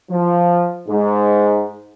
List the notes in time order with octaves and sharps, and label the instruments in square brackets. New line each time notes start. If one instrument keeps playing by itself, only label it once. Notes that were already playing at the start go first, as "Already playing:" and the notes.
[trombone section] F3
G#2